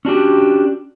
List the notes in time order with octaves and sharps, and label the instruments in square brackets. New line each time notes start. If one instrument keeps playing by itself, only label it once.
[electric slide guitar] C#4 D4 F#4 G4